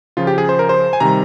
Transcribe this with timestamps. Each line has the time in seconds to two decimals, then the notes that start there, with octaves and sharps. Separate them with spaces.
0.17 C#3 F3 F4
0.27 G4
0.38 G#4
0.49 C5
0.59 A#4
0.69 C5
0.93 G#5
1.00 C3 D#3 G3 A#5